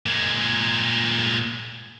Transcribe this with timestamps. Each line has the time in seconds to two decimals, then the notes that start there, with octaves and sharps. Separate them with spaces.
0.06 A#2 G#3